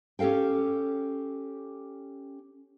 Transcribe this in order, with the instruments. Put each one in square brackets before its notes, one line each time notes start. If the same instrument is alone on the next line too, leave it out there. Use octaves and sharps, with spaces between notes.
[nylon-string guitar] C#4 G4 A4 F5 G5